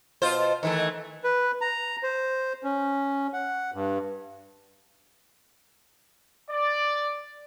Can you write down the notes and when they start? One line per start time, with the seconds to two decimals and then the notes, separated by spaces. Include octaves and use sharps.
0.22 B2 F4 C5
0.63 D#3 E3 A3
1.24 B4
1.61 A#5
2.03 C5
2.64 C#4
3.33 F#5
3.74 G2
6.50 D5